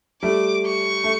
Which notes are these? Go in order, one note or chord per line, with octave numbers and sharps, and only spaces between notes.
G3 A3 D6
C#6
A3